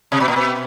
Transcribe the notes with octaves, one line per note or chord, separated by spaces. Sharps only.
C3
B2
A#2
B2